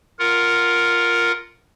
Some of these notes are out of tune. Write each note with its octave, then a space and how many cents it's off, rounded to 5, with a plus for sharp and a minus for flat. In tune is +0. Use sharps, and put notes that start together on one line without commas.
F4 +0 A#4 +0 F#5 +0